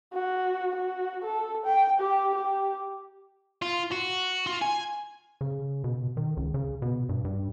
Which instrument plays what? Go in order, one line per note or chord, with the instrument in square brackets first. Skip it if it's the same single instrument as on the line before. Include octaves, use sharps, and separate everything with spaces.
[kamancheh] F#4
F#4
A4
G5
G4
G4
[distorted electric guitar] F4
F#4
F4
G#5
[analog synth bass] C#3
B2
D#3
C#2
C#3
B2
G2
G2